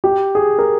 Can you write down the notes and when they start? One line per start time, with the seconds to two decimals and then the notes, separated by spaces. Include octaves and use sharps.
0.04 G4
0.35 G#4
0.59 A#4